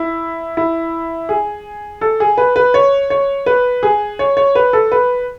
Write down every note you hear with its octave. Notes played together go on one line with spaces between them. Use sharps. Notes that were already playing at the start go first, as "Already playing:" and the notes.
Already playing: E4
E4
G#4
A4
G#4
B4
B4
C#5
C#5
B4
G#4
C#5
C#5
B4
A4
B4